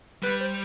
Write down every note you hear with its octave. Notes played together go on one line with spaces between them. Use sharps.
G3 B4
C5